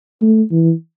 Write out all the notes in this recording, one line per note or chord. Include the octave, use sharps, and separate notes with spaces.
A3
E3